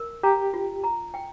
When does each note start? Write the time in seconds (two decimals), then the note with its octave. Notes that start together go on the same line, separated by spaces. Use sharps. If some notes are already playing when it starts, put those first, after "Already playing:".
Already playing: A#4
0.23 G4 A#5
0.53 F4
0.84 A#5
1.14 G5